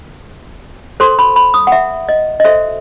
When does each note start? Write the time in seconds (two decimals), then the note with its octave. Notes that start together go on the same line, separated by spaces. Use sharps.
1.00 F#4 A4 C5 C6
1.19 B5
1.36 B5
1.54 D#6
1.67 F#5
1.72 E5
2.09 D#5
2.40 D#5
2.44 F#4 A4 C5 E5